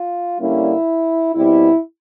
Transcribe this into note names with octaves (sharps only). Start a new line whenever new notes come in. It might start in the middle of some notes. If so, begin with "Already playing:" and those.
Already playing: F4
D3 G3 A#3 C#4 E4
B2 G3 C4 E4